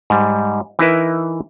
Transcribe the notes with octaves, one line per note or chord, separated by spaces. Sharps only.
G#2 G3
E3 D#4 E4 A#4 B4 E5